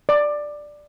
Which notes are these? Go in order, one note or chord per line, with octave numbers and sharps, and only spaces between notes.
D5